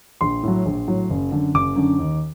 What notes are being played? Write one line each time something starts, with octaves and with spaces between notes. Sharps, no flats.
A#1 C6
A2 F#3
A#1
A2 F#3
F#1
F#2 D3
F#1 D6
F#2 D3
D#2